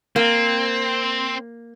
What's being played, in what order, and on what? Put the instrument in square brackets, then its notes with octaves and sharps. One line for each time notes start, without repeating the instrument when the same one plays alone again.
[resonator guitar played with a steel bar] A#3 [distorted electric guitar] C4